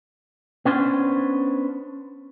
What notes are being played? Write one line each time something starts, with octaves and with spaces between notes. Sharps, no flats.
B3 C#4 D4 C5